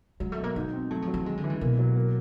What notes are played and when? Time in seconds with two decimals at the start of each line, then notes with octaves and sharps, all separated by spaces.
0.20 F#3 G#3
0.32 A3
0.38 B2
0.44 A#3
0.56 G#3 D#4
0.73 C4
0.91 F#3 A3
1.02 F3
1.08 F#3
1.14 E3
1.26 D#3 G#3
1.37 D3
1.44 E3
1.50 C#3
1.61 B2 A#3
1.79 F#3
1.96 A#3